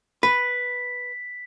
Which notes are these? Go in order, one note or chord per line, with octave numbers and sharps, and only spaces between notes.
B4 B6